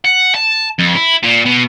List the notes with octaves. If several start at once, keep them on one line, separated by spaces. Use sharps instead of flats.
F#5
A5
F2
E4
A#2
B2